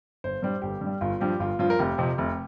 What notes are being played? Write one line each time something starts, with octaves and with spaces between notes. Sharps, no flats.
G1 C5
G2 G3 C5
G1 G4
G2
G3
G1 F4
G2 F3 G4
G1 F4
G2 F3 F4
A#4
F1 G4
F2 C3
F1